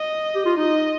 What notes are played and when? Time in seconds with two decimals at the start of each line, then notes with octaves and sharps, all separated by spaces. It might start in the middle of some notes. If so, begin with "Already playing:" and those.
Already playing: D#5
0.35 G4
0.46 F4
0.57 D#4 D#5